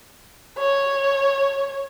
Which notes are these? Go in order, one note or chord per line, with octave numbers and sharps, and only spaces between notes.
C#5